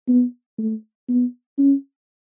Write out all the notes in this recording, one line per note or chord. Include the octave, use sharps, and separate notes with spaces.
B3
A3
B3
C#4